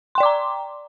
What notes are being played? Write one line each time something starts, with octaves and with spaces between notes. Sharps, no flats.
D5 G5 A#5 C6 D6